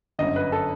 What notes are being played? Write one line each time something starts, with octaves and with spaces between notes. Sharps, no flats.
G1 F#2 D3 D#5
B4
A4